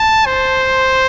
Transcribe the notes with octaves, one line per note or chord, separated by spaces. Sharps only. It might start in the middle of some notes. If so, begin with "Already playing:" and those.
Already playing: A5
C5